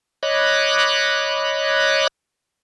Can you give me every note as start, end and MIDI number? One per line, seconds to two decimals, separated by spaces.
0.23 2.07 73
0.23 2.07 75
0.23 2.07 83
0.23 2.07 86
0.23 2.07 90